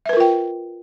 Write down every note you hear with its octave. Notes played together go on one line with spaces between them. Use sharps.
F4 A#4 B4 E5 G5